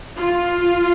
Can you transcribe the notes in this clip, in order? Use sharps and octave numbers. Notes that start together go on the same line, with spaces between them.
F4